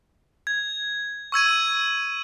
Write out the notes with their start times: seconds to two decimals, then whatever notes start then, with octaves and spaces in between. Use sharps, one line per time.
0.47 G#6
1.32 C#6 E6 G#6 D#7